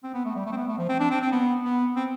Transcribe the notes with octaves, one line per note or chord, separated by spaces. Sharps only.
C4
B3
A3
G3
A3
C4
B3
A3
F3
C4
D4
C4
C4
B3
B3
C4